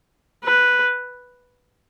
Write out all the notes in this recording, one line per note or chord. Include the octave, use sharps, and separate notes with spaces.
B4